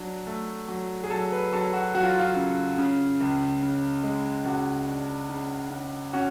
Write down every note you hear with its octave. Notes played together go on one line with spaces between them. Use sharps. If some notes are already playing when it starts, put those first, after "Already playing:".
Already playing: F#3 D4
A3
F#3
G#4
F#3 A4
B4
F#3 A4
F#4
F#3 F#4
F4
F4
C#3
C#3
C#2
C#3
G#3
C#2 F#4
D4
C#3
C#3
C#4 F#4